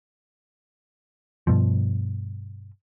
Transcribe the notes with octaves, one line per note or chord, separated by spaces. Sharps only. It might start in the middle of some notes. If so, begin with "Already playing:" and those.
G2 B2 F3